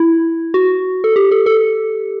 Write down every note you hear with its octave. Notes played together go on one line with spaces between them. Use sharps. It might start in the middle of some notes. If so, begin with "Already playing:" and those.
Already playing: E4
F#4
A4
G4
A4
A4